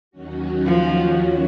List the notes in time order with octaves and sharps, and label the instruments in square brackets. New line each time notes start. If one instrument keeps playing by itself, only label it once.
[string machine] D#2 D#3 F#3 C#4 F#4
[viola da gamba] F3